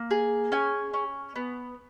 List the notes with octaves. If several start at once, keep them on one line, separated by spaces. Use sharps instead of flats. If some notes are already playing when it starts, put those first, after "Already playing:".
Already playing: A#3
G#4
C#4 G#5
C#4
B3